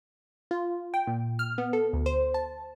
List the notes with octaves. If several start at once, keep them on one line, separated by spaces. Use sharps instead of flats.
F4
G5
A#2
F6
B3
A4
D2
C5
A5